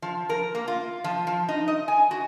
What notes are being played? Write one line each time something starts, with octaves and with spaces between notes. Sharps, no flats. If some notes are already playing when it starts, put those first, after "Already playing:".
F3
A#4
A#3
F4
F3
F3
D#4
D#5
G#5
F#4